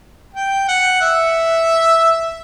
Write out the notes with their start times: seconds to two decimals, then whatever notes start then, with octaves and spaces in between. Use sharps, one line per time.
0.35 G5
0.68 F#5
1.01 E5